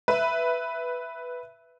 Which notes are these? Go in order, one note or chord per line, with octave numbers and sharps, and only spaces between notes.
B4 E5